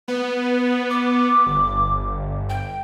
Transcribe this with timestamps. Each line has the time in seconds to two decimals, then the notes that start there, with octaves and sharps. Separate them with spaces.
0.08 B3 B4
0.90 D6
1.47 G1
2.49 G5